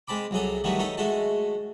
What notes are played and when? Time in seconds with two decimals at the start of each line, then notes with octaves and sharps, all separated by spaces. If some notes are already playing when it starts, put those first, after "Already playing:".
0.08 G#3 C4 A5 B5 D6
0.31 C2 F#3 G#4 A4
0.64 D#3 E3 F#3 G3 A3 B3
0.79 B3 D#4 A4 C#5
0.97 G#3 A3 F#4 A5